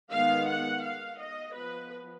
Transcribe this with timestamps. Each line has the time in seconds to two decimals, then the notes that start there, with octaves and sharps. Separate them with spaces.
0.11 D#3 G#3 B3 F5
0.48 F#5
0.84 F5
1.20 D#5
1.55 F3 B3 B4